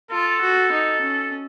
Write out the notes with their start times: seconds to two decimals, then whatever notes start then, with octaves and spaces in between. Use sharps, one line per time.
0.11 F4 A4
0.41 F#4
0.72 D#4
1.01 C#4